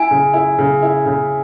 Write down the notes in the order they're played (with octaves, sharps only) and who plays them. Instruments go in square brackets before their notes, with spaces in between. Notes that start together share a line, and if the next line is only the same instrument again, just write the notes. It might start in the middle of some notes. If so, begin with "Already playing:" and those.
Already playing: [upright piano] E4 [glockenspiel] G#5
[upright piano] C#3
E4
C#3
E4
C#3